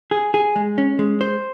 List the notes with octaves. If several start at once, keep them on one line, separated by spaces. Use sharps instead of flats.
G#4
G#4
G#3
C#4
G#3
C5